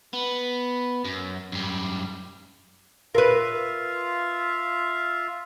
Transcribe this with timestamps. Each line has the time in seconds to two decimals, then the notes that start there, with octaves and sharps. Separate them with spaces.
0.13 B3
1.05 F#2
1.52 F#2 G3
3.15 F4 A#4 B4 E5 F5